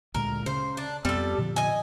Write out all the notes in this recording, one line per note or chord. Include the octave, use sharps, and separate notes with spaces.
D2 A#2 G#3 A#4
C#3 C5
D4
F2 G3 B3 C4 A4
A#2 D3 F3
D#5 G#5